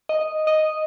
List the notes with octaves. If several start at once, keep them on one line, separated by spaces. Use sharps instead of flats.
D#5
D#5